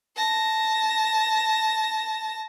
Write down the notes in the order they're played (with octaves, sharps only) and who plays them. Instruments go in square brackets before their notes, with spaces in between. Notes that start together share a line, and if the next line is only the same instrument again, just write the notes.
[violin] A5 A#6